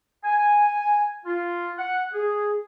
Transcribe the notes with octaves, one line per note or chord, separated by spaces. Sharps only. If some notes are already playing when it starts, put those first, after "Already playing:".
G#5
F4
F#5
G#4